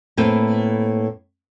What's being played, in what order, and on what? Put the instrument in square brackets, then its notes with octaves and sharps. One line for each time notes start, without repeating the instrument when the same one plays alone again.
[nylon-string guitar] A2 A#3 C4 B4 C5 G5